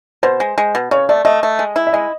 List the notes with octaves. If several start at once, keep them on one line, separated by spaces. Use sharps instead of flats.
B2 C5
G#3
G#3
B2
C#3 C#5
A3 D5
A3 D#5
A3
G#3
E4
E5
G#3 D#5